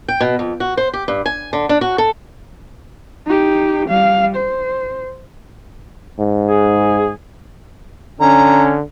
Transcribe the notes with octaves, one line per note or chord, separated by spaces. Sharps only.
G5
B2
F2
F#4
C5
G4
G2
G#5
D3
D4
F#4
A4
D#4 G4
G3 F5
C5
G#2
G#4
D3 C#4 A#5